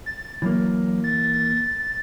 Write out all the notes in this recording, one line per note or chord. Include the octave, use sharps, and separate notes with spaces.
A6
E3 F#3 A#3
A6